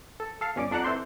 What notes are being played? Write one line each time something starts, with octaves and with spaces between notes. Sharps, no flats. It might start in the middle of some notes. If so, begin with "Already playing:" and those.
A4
A4 F5
G1 C#4 D5 D6
F2 D4 D5 F#5 A#5 F#6
E3 C4 A4 C6 G6